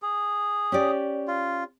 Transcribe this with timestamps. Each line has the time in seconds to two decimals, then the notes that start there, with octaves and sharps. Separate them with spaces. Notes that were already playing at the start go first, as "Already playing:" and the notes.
0.02 G#4
0.72 C#4 G4 D5
1.28 F4